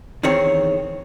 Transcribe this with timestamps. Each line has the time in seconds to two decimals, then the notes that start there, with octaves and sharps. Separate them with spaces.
0.23 E2 C3 D#3 C4 C#5